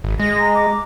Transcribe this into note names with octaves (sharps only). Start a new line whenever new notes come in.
G#1
G#3 A#6
A#5
D6